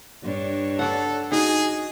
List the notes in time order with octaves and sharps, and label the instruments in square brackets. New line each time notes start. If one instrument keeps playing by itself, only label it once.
[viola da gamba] G2 D4 C#5
[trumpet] A4 [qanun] D5 F#5
[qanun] D#4 [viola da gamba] F#4 [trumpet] G#4